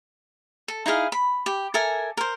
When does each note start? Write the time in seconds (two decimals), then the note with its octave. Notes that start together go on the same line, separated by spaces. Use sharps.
0.68 A4
0.86 D#4 E4 G#4 F5
1.12 B5
1.46 G4
1.74 A4 A#4 E5 G#5
2.17 A#4 C5